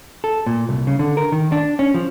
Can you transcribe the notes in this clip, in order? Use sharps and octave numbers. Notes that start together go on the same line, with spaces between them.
A4
A#2
C2
C#3
D3
A#4
D#3
D4
C#4
F3